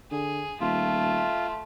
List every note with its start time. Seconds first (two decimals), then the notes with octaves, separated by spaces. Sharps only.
0.11 D3 G#4
0.61 D#1 A3 F4